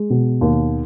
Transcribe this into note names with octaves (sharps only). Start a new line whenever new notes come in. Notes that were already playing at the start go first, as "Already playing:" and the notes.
Already playing: G#3
B2
D#2